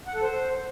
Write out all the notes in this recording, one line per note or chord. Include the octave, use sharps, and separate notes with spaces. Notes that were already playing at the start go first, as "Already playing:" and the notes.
F#5
A4
C5